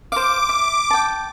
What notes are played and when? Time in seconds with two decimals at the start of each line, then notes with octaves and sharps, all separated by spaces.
0.12 C5 F5 D6
0.49 E5
0.90 G5 A5